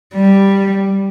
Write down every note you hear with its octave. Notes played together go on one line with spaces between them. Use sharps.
G3